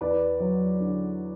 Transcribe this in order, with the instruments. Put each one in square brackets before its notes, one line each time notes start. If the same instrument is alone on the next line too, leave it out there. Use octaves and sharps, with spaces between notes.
[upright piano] E2 B4 D5
F#3
D3